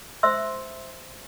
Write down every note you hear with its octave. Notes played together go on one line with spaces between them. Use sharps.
C5 E5 C6 E6